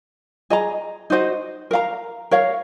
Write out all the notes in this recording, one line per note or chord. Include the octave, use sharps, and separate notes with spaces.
G#4 D#5 A#5
D#4 F#4 C5 D#5
A#4 F5 A#5
A#4 C#5 F5